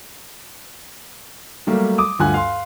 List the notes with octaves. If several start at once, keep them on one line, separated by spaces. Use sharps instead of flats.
F#3 G3 A3 A#3
D6 D#6
D2 G2 F4 F#5 G#5 F#6
F5 C6